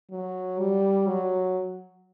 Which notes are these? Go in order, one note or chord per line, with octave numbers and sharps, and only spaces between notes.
F#3
G3
F#3